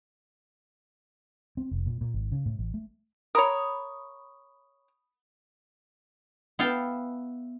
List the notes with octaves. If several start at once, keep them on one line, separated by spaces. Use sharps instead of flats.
C4
F1
A#2
A#2
G#1
C#3
A2
A1
A3
A#4 C#5 B5 D#6
B3 E4 F5 G5 A5